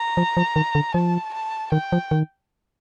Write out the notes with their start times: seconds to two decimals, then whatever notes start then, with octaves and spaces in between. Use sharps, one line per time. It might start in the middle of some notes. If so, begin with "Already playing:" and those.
Already playing: A#5
0.17 F3
0.37 F3
0.56 D#3
0.75 D3
0.94 F3 A5
1.33 A5
1.72 D#3 G5
1.92 F3
2.11 D#3